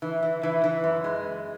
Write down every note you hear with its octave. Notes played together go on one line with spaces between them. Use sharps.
E3
E3
E3
E3
F#2
G#3